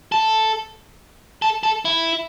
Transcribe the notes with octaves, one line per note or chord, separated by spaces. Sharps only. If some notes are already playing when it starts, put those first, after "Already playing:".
A4
A4
A4
E4